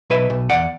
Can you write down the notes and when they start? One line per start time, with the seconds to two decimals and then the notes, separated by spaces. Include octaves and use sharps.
0.10 B1 B4 E5
0.30 B1
0.50 E2 D5 F#5